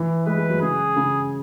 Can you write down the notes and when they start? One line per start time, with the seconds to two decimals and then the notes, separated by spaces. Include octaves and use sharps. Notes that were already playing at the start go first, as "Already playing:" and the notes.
Already playing: E3
0.26 G#3 B4
0.38 G#3
0.50 F#3
0.61 C#3 G#4
0.96 C#3